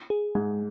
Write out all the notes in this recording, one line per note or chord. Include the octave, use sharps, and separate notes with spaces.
G#4
G#2 G#3